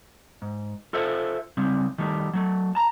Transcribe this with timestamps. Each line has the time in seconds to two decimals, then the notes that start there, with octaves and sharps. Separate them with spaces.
0.42 G#2
0.93 F4 A4 C5 E5
1.57 C#3 G3 C4
1.98 D#3 G3 A3
2.33 F#3 A3
2.75 A5 A#5